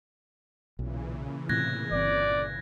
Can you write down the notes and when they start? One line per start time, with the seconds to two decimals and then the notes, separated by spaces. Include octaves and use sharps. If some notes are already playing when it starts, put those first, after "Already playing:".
0.79 B1 A#2 C#3 E3
1.49 A2 C3 F#6 G#6 A#6
1.91 G1 C4 D5